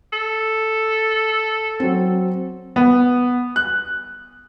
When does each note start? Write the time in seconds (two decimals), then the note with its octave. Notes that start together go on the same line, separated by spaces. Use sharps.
0.13 A4
1.80 F#3 C4
2.76 B3
3.56 F#6